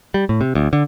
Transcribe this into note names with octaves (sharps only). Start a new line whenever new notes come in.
G3
A2
C3
D2
D3